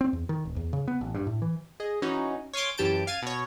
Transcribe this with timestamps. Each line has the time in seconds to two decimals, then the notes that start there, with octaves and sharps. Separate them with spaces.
0.01 C4
0.13 E2
0.29 D#3
0.45 D1
0.56 E2
0.73 C#3
0.88 B3
1.01 A1
1.15 G2
1.27 A2
1.42 E3
1.80 G#4 D#5
2.02 E3 C#4 D#4 F#4
2.53 C#5 F5 G#5 C6 D6
2.78 F#2 E3 G4 A5 G6 D7
3.07 F5 F6 G#6 A6 D#7
3.22 B2 C#5